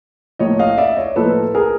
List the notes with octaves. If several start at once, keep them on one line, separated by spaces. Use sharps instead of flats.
A2 F3 A#3 C#5 D#5
D#5 F5
D5 E5
C#5 D#5
A2 F3 A#3 A4 B4
G#4 A#4